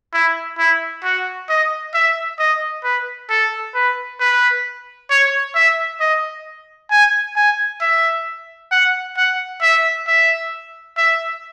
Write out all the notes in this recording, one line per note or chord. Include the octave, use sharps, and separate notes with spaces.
E4
E4
F#4
D#5
E5
D#5
B4
A4
B4
B4
C#5
E5
D#5
G#5
G#5
E5
F#5
F#5
E5
E5
E5